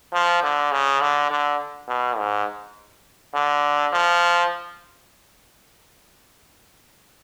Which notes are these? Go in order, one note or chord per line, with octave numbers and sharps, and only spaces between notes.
F3
D3
C#3
D3
D3
B2
G#2
D3
F3